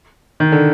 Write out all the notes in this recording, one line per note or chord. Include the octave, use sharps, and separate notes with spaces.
D#3
D3